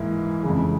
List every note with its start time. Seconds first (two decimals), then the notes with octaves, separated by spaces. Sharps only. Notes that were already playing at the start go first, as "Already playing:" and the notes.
Already playing: G#2 E3 A#3 E4
0.43 F2 C#3 E3 G#3